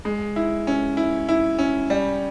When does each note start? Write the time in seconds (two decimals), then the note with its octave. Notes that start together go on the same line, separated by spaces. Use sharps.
0.05 G#3
0.36 E4
0.67 C#4
0.97 E4
1.29 E4
1.59 C#4
1.90 G3